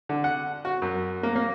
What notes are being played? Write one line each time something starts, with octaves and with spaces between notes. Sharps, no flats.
D3
F#5
F#4
F#2
A#3
A#3